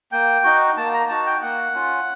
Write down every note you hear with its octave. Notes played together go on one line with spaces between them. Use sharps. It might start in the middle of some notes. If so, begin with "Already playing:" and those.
A#3 G5
D#4 F#4
A#3 A5
A#5
D#4 F#4 A5
G5
A#3 F#5
C#4 F4